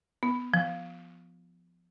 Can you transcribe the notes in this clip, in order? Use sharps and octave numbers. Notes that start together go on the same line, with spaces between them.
B3
F3